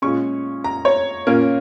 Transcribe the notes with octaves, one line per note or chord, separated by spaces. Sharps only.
A#2 G#3 C#4 C#6
A#5
C#5
A#2 A#3 C#4 A#4